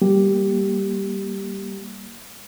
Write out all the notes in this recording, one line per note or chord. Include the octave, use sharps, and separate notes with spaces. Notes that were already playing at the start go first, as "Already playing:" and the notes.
G3 A#3 G4